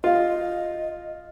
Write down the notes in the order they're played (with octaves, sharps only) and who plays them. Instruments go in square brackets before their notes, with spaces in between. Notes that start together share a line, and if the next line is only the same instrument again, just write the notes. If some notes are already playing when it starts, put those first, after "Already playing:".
[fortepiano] F4 [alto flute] D#5